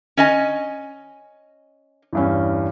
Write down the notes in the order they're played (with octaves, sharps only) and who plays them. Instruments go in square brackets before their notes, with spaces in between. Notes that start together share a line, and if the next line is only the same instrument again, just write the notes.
[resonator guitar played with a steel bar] C#4 D#5 G#5
[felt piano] E2 G2 C#4